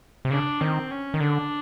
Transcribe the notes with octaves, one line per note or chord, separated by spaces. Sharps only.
C3
C#3 D4
D#3 C4
C#4
D#3
D3 D4